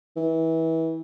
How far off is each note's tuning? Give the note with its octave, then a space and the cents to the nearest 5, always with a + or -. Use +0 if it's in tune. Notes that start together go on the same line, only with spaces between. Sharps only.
E3 -25